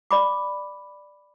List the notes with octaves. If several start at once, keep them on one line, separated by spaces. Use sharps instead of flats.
D5 B5 D6